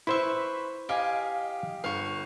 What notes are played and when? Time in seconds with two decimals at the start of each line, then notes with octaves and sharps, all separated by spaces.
0.07 E4 B4 C5 E5 C#6
0.89 G4 D#5 F5 G#5
1.84 G1 F5 C#6